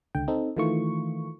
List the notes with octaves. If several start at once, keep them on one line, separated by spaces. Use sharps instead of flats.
C#2 D3 G5
C4 D#4 A4
D#3 E3 A3 F4 C#6